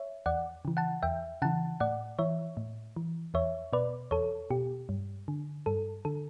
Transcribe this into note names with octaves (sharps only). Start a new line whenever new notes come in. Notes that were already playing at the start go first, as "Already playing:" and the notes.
Already playing: C#5 E5
E2 D5 F#5
C#3 E3
F#5 A5
E2 E5 G5
C#3 E3 F#5 A5
A2 D5 F#5
E3 C#5 E5
A2
E3
E2 C#5 E5
B2 B4 D5
E2 A4 C#5
B2 G4
G2
D3
G2 A4
D3 A4